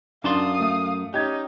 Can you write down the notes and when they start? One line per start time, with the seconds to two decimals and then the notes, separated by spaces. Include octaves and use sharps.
0.24 F#2 D4 F5 A5 C6 D#6
0.60 A3
1.14 C#4 D#4 G4 G#6